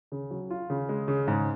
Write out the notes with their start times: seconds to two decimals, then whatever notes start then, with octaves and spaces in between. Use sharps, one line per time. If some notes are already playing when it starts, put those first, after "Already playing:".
0.12 C#3
0.31 F#3
0.50 F4
0.70 C#3
0.89 G#3
1.08 C#3
1.28 G#2